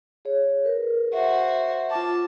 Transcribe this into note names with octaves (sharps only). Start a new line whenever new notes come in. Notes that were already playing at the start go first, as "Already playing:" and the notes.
G#4 C#5
A#4 B4
F#4 C5 E5
F4 A5 D6